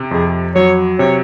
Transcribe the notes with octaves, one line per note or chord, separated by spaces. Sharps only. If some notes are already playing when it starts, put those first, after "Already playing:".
Already playing: C3
F2 G#4
F#3 C#5
C3 C#5